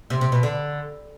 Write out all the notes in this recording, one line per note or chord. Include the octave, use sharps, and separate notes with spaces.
C3
C3
B2
D3